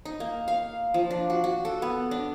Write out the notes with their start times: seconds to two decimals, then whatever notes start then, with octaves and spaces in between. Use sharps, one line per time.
0.05 D#4
0.20 A#3
0.48 F5
0.94 F3
1.11 D4
1.30 F#4
1.44 F#4
1.65 A4
1.82 B3
2.11 D4